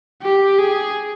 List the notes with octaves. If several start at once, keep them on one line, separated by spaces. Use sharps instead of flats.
G4
G#4